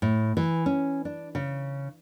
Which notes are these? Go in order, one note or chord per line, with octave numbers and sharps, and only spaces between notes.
A2
E3
C#4
D4
C#3